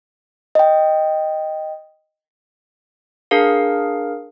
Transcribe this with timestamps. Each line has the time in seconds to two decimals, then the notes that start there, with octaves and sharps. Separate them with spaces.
0.55 D#5 G5
3.31 D4 G#4 A#4 F5